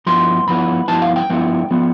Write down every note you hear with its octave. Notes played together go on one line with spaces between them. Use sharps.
G2 F3 B3 E4 C6
G2 F3 B3 E4 B5
G2 F3 B3 E4 A5
F5
G5
G2 F3 B3 E4
F3 B3